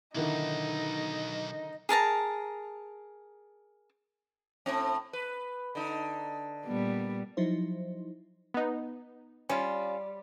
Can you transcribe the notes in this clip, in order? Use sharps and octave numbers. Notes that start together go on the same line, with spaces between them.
B1 D3 D#3 D#4 E4
G#4 A#4 A5 A#5
A2 C4
B4
D3 D#4
A#2 G3 B3
F3 F#3 D#4 E4 C5
B3 D#4
G3 C#4 F4